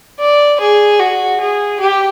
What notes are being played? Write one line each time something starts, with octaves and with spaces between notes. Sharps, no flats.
D5
G#4
F#4
G#4
G4